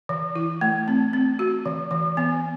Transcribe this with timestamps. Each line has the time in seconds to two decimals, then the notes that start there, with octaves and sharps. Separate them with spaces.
0.09 E3
0.35 E4
0.61 A3
0.88 C4
1.13 C4
1.39 F#4
1.66 E3
1.91 E3
2.17 B3